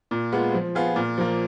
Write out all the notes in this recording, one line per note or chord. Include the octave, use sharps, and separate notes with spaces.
A#2
G#3 B3 F4
F3
B3 F4 G#4
A#2
F3 A#3